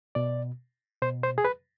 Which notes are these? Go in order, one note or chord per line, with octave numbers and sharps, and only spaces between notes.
B2 D5
B2 C5
C5
G#4
B4